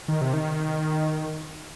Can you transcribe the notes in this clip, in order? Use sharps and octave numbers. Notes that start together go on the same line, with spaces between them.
D#3
C3
D#3